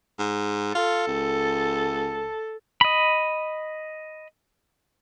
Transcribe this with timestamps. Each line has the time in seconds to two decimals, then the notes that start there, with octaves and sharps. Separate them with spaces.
0.19 G#2
0.75 F4 A4
1.07 C#2
2.81 D#5 B5